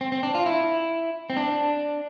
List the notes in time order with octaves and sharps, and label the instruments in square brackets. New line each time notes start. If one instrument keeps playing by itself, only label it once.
[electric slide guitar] C4
C4
D4
F4
E4
C4
D4